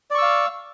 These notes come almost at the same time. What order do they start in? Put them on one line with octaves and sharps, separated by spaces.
D5 C#6 E6 F5